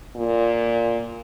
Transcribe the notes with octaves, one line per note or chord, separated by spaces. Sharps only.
A#2